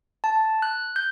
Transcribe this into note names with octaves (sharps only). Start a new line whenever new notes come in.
A5
F#6
G6